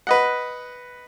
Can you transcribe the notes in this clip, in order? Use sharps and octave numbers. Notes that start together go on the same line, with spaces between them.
B4 D#5 F#5